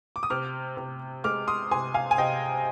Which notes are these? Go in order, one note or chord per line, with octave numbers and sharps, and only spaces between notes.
D6
D#6
C3 D6 F6
C3
G#3 D6 F6
C6 D#6
C3 G#5 C6
F5 G#5
G#5
C3 D#5 G5